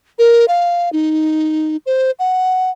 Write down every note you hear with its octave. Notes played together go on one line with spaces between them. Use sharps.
A#4
F5
D#4
C5
F#5